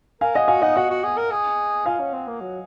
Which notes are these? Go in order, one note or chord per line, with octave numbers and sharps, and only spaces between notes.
A#4 F5 G#5
G#4 D#5 F#5
F#4 F5 G#5
D#4 D#5 F#5
F#4 D#5 F#5
F#4
G#4
A#4
G#4
F4 F5 G#5
C#4
C4
A#3
F#3